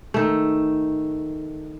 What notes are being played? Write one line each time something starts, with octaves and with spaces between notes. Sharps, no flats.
D#3 A3